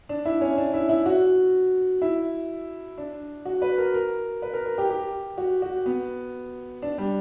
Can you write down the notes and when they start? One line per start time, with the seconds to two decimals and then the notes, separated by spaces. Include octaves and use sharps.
0.09 D4
0.25 E4
0.41 C#4
0.57 D4
0.74 E4
0.89 E4
1.06 F#4
2.02 E4
2.98 D4
3.45 F#4
3.62 B4
3.78 A#4
3.94 A#4
4.42 B4
4.54 A#4
4.66 A#4
4.78 G4
4.90 G4
5.38 F#4
5.62 F#4
5.86 B3
6.82 D4
6.98 G3